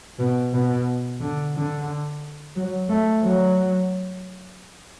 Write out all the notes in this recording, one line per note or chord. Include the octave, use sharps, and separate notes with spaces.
B2
B2
D3
D3
F#3
A3
F#3